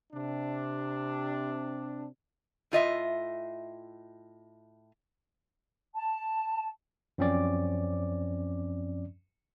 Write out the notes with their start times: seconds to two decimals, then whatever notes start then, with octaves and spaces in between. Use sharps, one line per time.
0.13 C3 D4
2.72 A2 F4 D#5 E5
5.93 A5
7.18 F#2 F3 C4 C#4 D5 D6